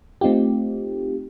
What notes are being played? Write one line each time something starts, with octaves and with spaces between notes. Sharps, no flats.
A3 C4 D#4 F4 G4